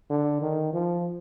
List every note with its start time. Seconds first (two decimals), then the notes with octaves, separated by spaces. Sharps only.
0.10 D3
0.42 D#3
0.73 F3